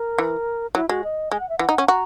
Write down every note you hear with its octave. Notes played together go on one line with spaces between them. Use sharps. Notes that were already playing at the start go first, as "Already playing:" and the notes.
Already playing: A#4
E3
F#3 E4
G#3 F#4
D#5
G#3 G#5
F#5
E5
E3 F#5
D#4
C#4
F#4 A#5